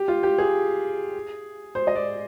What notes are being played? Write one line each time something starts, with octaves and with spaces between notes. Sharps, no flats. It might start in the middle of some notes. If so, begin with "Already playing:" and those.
Already playing: G4
F4
G4
G#4
C5
D#5
D5